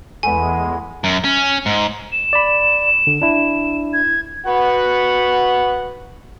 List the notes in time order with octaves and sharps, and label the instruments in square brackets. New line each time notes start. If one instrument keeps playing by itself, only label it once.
[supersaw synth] E2 G#3 [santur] A3 B3 B5 [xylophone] G#5
[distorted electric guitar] F#2
C#4
G#2
[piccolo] E7
[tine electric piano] D5 B5
D3
D4 E4
[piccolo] G#6
[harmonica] F#4 B4 F#5